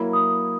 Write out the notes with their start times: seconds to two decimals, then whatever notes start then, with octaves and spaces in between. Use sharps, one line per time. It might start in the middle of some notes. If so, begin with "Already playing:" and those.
Already playing: F#3 A#3 E4 B5
0.13 D#6